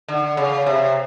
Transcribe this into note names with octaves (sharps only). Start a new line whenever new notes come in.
D3
C#3
C3